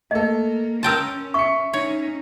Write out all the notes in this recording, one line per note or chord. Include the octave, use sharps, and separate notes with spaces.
A3 A#3 A4 D#5
C#4 A#4 G5 A5 C6 E6
E5 C#6 C#7
C#4 D#4 C#5